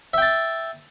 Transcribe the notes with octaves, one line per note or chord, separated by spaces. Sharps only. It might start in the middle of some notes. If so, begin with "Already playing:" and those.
E5 G5 A5